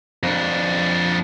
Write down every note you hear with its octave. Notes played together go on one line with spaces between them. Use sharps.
F2 D4